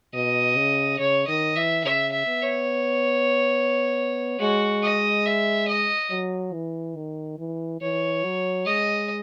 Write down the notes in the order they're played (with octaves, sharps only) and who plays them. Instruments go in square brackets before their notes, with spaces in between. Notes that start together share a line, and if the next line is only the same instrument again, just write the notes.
[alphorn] B2 [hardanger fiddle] D#5
[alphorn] C#3
[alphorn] C#3 [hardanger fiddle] C#5
[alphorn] D#3 [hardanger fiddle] D#5
[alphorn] E3 [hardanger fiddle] E5
[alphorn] C#3 [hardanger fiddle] E5
[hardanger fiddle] E5
[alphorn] B3
[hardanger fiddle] C#5
[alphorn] G#3 [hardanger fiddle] F#4
[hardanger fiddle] D#5
E5
D#5
[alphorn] F#3
E3
D#3
E3
[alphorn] E3 [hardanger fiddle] C#5
[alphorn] F#3
[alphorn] G#3 [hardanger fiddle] D#5